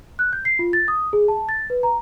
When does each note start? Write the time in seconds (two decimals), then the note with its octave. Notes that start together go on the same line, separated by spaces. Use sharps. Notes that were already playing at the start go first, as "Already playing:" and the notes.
0.19 F#6
0.33 G6
0.45 C7
0.59 F4
0.73 A6
0.88 D#6
1.13 G#4
1.28 A5
1.49 A6
1.70 B4
1.83 A#5